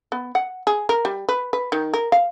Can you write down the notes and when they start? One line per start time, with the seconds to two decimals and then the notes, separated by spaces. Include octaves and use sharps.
0.12 B3
0.35 F#5
0.67 G#4
0.89 A#4
1.05 G3
1.29 B4
1.53 B4
1.72 D#3
1.94 A#4
2.12 F5